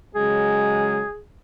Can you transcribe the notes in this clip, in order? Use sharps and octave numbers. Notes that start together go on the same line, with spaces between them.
C#3 F#3 G#3 G#4